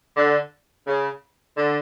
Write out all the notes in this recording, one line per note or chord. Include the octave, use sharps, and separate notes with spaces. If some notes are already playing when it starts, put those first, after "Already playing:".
D3
C#3
D3